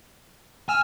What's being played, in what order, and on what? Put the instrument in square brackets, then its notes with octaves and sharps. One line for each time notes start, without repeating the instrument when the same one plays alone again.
[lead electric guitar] G#5 [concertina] E6 F6